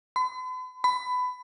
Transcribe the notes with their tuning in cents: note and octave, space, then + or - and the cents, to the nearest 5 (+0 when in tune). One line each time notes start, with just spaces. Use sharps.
B5 +45
B5 +20